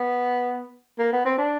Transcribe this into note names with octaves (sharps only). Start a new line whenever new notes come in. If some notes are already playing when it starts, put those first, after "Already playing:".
Already playing: B3
A#3
B3
C4
D4